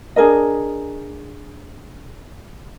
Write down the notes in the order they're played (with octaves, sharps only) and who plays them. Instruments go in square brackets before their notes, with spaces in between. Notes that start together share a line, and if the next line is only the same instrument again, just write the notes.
[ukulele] D4 G#4 A#4 D#5